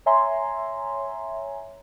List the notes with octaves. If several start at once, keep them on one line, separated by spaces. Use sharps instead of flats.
C#5 E5 G#5 A#5 C6